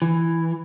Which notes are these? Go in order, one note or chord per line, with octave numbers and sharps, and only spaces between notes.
E3